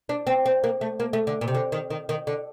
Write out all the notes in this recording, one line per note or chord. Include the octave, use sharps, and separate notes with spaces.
D4
C4
C4
A#3
A3
A#3
A3
D3
A#2
C3
D3
D#3
D#3
D#3
D3